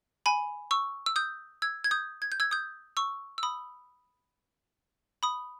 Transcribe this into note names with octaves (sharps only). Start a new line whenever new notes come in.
G#5 B5
C#6 E6
E6
D#6 G6
E6 G#6
G#6
D#6 G6
G#6
G6
E6 G#6
D#6 G6
C#6 E6
E6
B5 D#6
B5 D#6